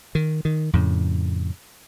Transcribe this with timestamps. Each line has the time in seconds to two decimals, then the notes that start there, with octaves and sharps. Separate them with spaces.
0.15 D#3
0.45 D#3
0.73 F2 A2 C#3